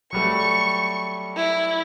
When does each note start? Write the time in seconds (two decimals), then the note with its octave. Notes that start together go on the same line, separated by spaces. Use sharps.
0.13 F#3 G3 A3 C#6
1.36 E4